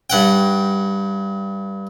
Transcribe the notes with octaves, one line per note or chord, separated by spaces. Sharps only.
G2 F#5 G5